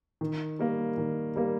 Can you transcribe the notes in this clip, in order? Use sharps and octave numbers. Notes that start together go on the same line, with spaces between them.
D#3
G3 A#3
D#3
G3 A#3